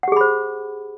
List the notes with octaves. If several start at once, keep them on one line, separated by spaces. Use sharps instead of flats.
G4 G#4 C5 F#5 B5